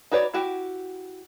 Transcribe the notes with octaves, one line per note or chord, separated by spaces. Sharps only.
D#4 F#4 B4 C#5 D5
E4 F#4 G4